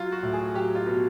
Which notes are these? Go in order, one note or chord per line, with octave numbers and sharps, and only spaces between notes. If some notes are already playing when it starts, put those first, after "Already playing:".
Already playing: F#3 F4
F#4
A2
G#4
F#3 G4
F4
B2